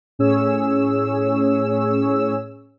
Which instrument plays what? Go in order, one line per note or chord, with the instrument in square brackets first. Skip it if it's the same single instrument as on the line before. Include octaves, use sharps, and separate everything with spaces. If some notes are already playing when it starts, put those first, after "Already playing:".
[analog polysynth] A2 C#4 G#4 C#5 E6